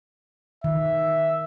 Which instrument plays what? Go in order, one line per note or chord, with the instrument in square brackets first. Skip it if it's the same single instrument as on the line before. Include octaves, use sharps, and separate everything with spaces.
[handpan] D#3 [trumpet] E5